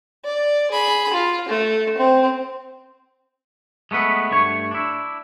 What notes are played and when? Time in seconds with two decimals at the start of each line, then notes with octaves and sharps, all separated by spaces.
0.24 D5
0.71 G#4 B5
1.13 F4
1.49 A3
1.98 C4
3.91 G#3 A3 B3 B4
4.31 G2 A3 C#5
4.71 D4 E4